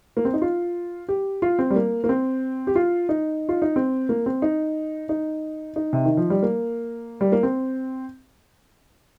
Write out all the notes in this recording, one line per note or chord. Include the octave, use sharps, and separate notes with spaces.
A#3
C4
D#4
F4
G4
F4
C4
G3
A#3
A#3
C4
G4
F4
D#4
F4
D#4
C4
A#3
C4
D#4
D#4
D#4
C3
D#3
F3
G3
A#3
G3
A#3
C4